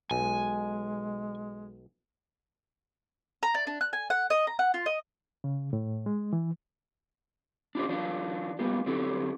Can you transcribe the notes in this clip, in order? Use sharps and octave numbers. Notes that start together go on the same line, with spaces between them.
B1 G#3 G#5
A#5
D5
D4
F#6
G#5
F#5
D#5
A#5
F#5
F4
D#5
C#3
A2
G#3
E3
D4 F4 G4 C5
E3 F#3 D4 F4
G3 A#3 B3 F4 G4
D3 F#3 C4 E4 G4 A4